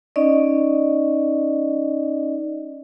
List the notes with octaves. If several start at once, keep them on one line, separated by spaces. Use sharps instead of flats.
C#4 D#4 D5 D#5